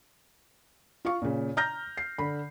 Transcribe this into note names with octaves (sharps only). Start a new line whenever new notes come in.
F4 F5 C#6
A#2 C#3
A#5 F6 G6 A#6
C7
D3 B5